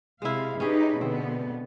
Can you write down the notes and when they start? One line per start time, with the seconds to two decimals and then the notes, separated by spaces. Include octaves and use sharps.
0.22 C3 G#3 E4 F5
0.60 C#4 D#4 G4 G#4 B4
1.01 B2 D3 B3 C4